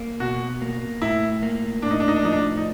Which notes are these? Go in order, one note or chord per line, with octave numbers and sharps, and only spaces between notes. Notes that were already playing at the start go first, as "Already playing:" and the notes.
Already playing: A#3
B2 F#4
A#3
A2 E4
A#3
A2 D4
D#4
D4
D#4
D4
F3 D#4
D4
D#4